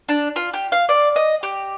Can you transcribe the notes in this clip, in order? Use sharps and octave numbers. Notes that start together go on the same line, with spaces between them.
D4
F4
G4
F5
D5
D#5
G4